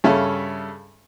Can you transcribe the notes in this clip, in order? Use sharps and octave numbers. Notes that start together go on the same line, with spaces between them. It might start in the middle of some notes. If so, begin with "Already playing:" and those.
G2 C#3 C#4 A4 E5 F5